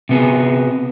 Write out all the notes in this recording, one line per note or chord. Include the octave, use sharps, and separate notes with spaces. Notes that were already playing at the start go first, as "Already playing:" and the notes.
C3 B3 G#4